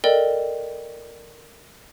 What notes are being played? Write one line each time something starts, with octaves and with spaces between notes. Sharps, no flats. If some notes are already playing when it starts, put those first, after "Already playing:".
A4 A#4 D5 D#5 G5